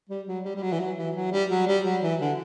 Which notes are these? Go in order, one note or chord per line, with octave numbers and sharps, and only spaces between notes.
G3
F#3
G3
G3
F#3
E3
F#3
E3
F#3
G3
F#3
G3
F#3
E3
D3